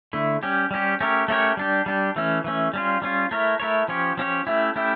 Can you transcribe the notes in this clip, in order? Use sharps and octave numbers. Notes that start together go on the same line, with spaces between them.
D3 A3 E4
G3 C#4 G4
G3 C#4 G4
A3 C#4 G4 A#4 C#5
A3 C#4 G4 A#4 C#5
G3 D4 G4
G3 D4 G4
E3 A3 C#4
E3 A3 C#4
G3 C#4 F4
G3 C#4 F4
A3 E4 A#4 C#5
A3 E4 A#4 C#5
F3 C#4 G4 C#5
F3 C#4 G4 C#5
A3 C#4 E4 G4
A3 C#4 E4 G4